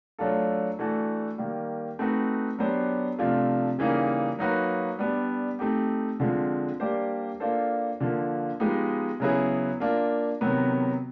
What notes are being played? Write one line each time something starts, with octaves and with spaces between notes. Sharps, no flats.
F#3 A3 D4 F4 A4
E3 A3 D4 F#4 A4
D#3 G3 A#3
A3 C4 D#4 F#4 B4
F#3 B3 D4 G4 C5
C3 F3 A3 D4 F4
C#3 E3 G3 A#3 D#4
F#3 A#3 D#4 F#4 B4
G3 B3 D4
A3 C4 D#4 G4
D3 F3 G#3 C4 F4
G3 A#3 D4 G4 C5
A#3 D4 F4 A4 C5
D3 F3 A#3
F3 G#3 B3 D#4 G4
C#3 F#3 B3 E4 G#4
A#3 D4 F4 A#4
C3 D#3 F#3 B3